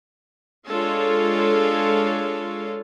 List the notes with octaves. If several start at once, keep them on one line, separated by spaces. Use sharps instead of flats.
G#3 D4 F4 A4 C#5 F5